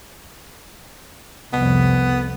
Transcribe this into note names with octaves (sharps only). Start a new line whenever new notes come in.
C2 F2 B3